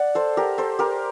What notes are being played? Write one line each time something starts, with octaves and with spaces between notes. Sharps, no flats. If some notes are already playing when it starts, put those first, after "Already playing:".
Already playing: D5 F#5
A4 C5
G4 A#4
A4 C5
G4 A#4